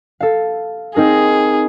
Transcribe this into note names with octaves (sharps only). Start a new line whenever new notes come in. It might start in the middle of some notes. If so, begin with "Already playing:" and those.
A4 F5
C4 D#4 G#4 A#4